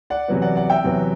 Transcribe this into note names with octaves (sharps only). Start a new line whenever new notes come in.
D5 F#5
E2 C3 F#3 B3
D5 F#5
D5 F#5
E5 G5
E2 C3 F#3 B3